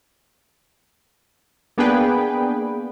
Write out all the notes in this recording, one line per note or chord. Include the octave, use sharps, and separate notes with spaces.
A#3 B3 D4 G#4 B4 G5